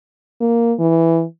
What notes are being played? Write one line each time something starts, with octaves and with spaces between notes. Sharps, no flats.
A#3
E3